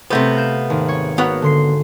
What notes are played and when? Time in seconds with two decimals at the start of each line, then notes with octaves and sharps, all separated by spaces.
0.10 C3 A3 B3 C#5 G6 A#6
0.36 F5 G6 E7
0.70 G#1
0.88 C#5
1.18 A#3 B3 F#4 C#5 F#5
1.42 D3 C6 C7